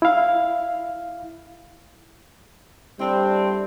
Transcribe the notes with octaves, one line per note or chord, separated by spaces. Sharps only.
E4 F5
G3 A3 C4 D4 E4